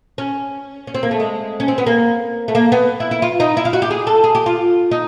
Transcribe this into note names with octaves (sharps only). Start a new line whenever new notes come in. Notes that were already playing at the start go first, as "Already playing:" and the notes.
C#4
C#4
C4
A#3
A3
G#3
C#4
C4
B3
A#3
A3
A#3
B3
E4
E4
F4
D#4
E4
F4
F#4
G4
G#4
A4
G#4
G4
F4
D#4